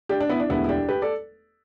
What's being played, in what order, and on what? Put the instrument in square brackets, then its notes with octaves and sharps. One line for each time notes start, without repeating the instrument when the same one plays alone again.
[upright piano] D4 G4
D4
B3 E4
D4
E1 D2 D3 G3 B3 E4
E4
D4 G4
G4 B4
A4 D5